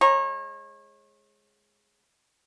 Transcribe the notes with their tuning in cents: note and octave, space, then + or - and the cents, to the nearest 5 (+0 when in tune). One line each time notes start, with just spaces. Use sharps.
G#3 +0 C#5 -35 A#5 +0